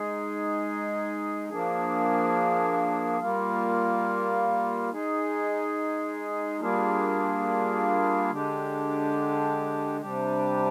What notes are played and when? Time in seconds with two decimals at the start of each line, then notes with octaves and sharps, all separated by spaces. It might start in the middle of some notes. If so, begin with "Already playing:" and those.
Already playing: G#3 D#4 G#4
1.49 F3 A#3 D4 G#4
3.20 G3 A#3 F4
4.90 G#3 D#4 G#4
6.60 G3 A#3 D4 F4 G#4
8.30 D3 G#3 D4 G4
10.01 C3 G3 D4 G4